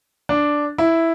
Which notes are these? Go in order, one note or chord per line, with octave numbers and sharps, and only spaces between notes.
D4
E4